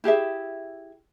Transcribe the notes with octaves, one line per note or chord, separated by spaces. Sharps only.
E4 G4 G#4 E5